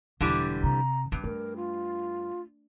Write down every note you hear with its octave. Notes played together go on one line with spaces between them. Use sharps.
E1 D3 E3 G3
C3 A#5
G2 B3
A3 A#4
F4